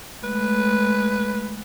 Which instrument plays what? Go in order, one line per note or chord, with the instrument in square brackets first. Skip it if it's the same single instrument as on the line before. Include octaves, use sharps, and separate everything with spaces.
[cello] G#3 A3 [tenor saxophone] B4